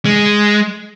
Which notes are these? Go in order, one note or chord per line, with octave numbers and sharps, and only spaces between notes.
G#3